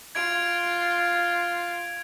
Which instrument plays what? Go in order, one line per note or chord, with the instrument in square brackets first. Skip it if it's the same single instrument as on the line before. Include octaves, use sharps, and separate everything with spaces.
[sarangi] F4 [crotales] G#6 D7 F7